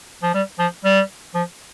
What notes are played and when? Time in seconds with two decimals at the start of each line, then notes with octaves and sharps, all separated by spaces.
0.22 F3
0.34 G3
0.59 F3
0.84 G3
1.34 F3